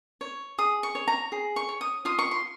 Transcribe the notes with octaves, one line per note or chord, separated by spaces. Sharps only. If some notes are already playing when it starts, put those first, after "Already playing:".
C#5
G#4 D#6
C#6
C#5
A#5
G#4
C#6
C#5
D#6
F4 D#6
C#6
C6